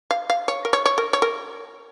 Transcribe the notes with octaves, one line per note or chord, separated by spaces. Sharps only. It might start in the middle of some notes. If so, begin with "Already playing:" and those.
F5
F5
C#5
A#4
C#5
C#5
A#4
C#5
A#4